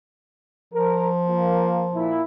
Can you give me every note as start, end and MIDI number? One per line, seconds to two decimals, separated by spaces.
0.74 2.16 53
0.74 1.07 70
1.28 1.85 58
1.28 1.85 65
1.28 1.85 70
1.93 2.21 46
1.93 2.21 64